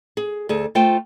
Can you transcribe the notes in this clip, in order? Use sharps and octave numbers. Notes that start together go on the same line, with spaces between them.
G#4
D2 G#4 A4
A3 F4 C5 G5